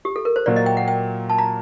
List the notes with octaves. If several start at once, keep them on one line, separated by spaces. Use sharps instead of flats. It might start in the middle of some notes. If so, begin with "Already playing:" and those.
G4
A4
A#4
C5
A#2 F#3 A#3 D5
D#5
G5
F#5
G5
A5
A#5